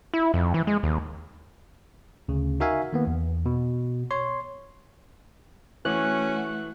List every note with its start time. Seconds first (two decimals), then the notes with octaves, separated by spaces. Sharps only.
0.14 E4
0.34 F2
0.54 E3
0.67 G#3
0.83 D#2
2.28 D2 C#3
2.60 D#4 F#4 A#4 E5 F5 G#5
2.93 D#3 A#3 B3
3.07 E2
3.46 B2
4.11 C#5 C6
5.85 E3 A3 C#4 F#4 F#6